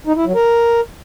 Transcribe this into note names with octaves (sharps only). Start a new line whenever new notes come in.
D#4
E4
F#3
A#4